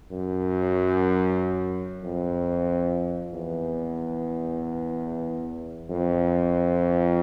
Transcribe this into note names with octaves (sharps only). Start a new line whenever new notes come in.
F#2
F2
E2
F2